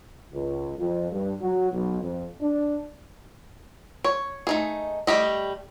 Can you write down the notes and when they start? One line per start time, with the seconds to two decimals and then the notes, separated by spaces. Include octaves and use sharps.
0.32 C#2
0.77 F2
1.12 G2
1.41 F#3
1.72 B1
2.02 F2
2.41 D4
4.04 C#5
4.47 A3 D#4 G#4
5.07 G3 A3 G4 D#5